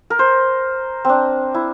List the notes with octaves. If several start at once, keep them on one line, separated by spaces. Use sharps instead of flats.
A#4
C5
C4 D4
E4